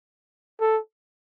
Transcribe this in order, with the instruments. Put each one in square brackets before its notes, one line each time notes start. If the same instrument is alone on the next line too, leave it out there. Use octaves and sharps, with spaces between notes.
[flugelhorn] A4